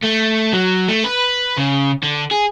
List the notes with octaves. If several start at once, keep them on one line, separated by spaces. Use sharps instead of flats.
A3
F#3
A3
B4
C#3
D3
G#4